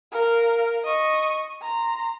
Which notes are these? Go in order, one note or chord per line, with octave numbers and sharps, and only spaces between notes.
A#4 F5
D#5 C#6
A#5 C6